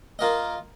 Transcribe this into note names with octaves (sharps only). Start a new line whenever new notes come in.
A#3 F4 A#4 D#5